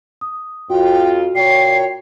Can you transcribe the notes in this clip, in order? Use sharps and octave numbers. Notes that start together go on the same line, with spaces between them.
D#6
F2 F4 F#4 G5
A#2 C#5 G5 C7